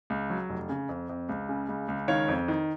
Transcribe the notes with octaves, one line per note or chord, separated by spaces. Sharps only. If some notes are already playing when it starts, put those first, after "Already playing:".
C#2
F#3
F1
C#3
F2
F2
C#2
C#3
C#2
C#2
D#3 C#5 F5
F2
D#3